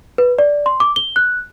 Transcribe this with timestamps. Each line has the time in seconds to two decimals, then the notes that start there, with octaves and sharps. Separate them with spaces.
0.18 B4
0.39 D5
0.66 C6
0.80 D6
0.96 G7
1.16 F#6